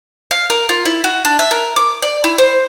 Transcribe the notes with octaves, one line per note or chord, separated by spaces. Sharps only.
F5
A#4
F4
E4
F#4
D4
E5
A#4
D6
D5
E4
C5